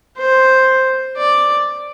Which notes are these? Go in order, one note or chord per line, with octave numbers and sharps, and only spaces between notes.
C5
D5